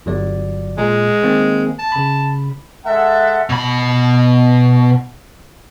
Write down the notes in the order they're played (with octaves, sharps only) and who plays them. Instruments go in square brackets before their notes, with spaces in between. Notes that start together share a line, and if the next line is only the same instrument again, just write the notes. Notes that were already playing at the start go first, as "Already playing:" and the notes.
[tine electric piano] G1 F#3 D5
[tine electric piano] A#2 [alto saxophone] G#3
[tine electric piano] D#3 A#3 C4
[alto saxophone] A5
[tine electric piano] C#3 B5
[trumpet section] G#3 A4 F#5 [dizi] E5
[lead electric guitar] B2 B5